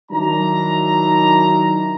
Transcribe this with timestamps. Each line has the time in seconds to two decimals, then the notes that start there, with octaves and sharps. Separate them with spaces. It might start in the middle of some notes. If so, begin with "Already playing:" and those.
0.11 D#3 F#3 D4 E4 A#5